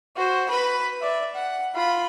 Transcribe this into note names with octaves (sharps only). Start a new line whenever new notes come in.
F#4 C5
B4 B5
D5 E5
F#5
F4 B5